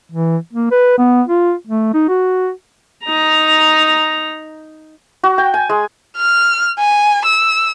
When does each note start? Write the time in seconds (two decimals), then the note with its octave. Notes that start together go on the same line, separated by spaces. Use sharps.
0.12 E3
0.53 A#3
0.71 B4
0.98 B3
1.27 F4
1.67 A3
1.94 D#4
2.09 F#4
3.05 D#4 A#5
5.23 F#4
5.38 G5
5.54 G#5
5.70 G#3
6.17 F6
6.79 G#5
7.25 E6